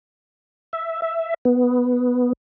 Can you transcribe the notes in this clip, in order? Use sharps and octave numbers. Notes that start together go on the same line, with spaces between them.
E5
E5
B3